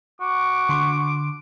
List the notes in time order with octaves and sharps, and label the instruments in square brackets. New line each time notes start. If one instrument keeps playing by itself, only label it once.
[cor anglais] F#4 [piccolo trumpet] D6
[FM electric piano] D3 C6